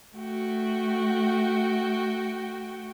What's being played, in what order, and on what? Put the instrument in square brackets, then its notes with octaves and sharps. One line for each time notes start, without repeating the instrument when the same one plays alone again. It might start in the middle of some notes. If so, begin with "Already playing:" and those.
[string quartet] A3 F#4 G5